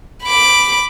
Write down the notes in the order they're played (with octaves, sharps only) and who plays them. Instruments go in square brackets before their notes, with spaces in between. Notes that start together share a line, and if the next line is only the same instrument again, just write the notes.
[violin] B5 D6